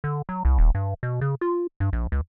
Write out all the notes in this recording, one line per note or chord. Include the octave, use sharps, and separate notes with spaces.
D3
F#3
C2
D#1
G2
B2
C#3
F4
G2
A#1
C#2